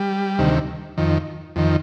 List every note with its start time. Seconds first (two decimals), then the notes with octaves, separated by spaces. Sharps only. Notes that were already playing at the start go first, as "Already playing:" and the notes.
Already playing: G3
0.39 D2 C3 D#3
0.98 F2 D#3
1.56 F2 D#3